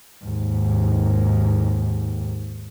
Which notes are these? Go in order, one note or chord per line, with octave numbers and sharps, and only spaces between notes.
D#2 G#2